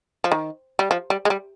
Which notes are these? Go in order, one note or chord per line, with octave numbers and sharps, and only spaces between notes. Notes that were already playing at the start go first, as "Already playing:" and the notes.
F3
D#3
G3
F3
G3
G#3
G3